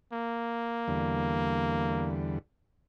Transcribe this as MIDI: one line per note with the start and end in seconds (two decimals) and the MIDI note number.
0.13 2.17 58
0.88 2.39 40
0.88 2.39 50
0.88 2.39 55